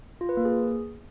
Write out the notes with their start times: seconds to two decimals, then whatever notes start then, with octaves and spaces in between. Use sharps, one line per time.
0.21 F4
0.29 B4
0.37 A#3
0.45 G#4